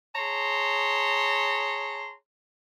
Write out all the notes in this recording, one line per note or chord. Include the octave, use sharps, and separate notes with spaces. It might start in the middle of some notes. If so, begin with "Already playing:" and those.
G#4 C#5 A5 A#5 C6